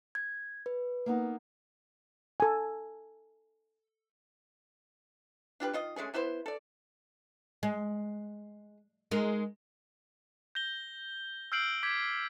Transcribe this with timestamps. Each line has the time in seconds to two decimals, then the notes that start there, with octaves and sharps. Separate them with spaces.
0.15 G#6
0.66 B4
1.06 A#3 B3 D#4
2.40 A4 G#5
5.60 D4 F4 G4 B4
5.73 D#3 F4 D#5
5.96 G#3 A3 C#4 G#4
6.14 B3 E4 B4 C5
6.46 A4 D5
7.63 G#3
9.11 G#3 D#4 A#4
10.55 G6 A#6 G7
11.52 E6 F6 G6 C7 D7 F#7
11.83 D6 G6 G#6 B6